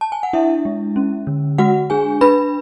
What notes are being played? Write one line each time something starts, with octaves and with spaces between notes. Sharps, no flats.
A5
G#5
F#5
D4 E4 E5
G#3
C#4
D3
G#3 F#4 F#5
D4 G#4 G#5
D4 B4 B5